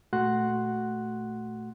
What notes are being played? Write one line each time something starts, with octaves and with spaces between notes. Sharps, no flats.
A#2 A3 F#4 F#5 C6 F#6